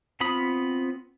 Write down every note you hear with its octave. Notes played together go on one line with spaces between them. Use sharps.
B3 C4 F4 B5 D#6